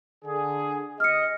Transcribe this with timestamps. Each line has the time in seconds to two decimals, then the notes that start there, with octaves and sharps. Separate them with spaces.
0.24 D3 G#4
1.00 D#5 F6 C#7